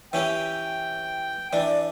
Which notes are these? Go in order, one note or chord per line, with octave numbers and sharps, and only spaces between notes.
E3 C#4 G4 G5
E3 D4 D5